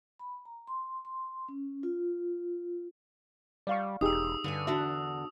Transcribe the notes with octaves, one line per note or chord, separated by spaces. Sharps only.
B5
A#5
C6
C6
C#4
F4
G3 D5 F5 C#6
E1 D#4 G4 G#4 D#6 E6
G2 D3 C#4 G#5
E2 D4 F#4 E5